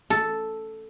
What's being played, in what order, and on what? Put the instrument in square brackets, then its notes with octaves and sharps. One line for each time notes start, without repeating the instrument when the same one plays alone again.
[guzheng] A4